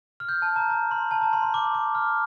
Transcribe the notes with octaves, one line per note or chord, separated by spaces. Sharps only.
F6
G6
A5
A#5
A#5
C6
A5
A#5
C6
C6
D6
D6
F6